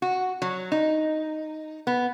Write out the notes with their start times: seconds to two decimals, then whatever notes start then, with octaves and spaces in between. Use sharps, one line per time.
0.02 F#4
0.42 F#3
0.72 D#4
1.87 B3